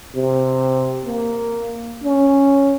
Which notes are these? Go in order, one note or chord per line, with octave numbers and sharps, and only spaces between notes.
C3
A#3
C#4